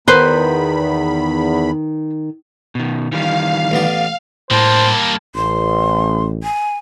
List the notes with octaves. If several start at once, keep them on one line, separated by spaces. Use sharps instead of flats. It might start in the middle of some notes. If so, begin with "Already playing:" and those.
E2 D#3 B4 C5 B5
B2 D#3
D#3 E3 G3 F5
A1 B3 D5
A2 G3 A#3 C5 A5
A1 C6
G#5